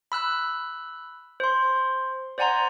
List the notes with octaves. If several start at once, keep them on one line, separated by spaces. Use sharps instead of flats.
B5 E6 F#6
C5 C6
C5 D5 F#5 G#5 A#5 C6